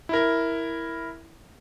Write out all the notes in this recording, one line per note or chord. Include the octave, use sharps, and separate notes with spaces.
E4 A#4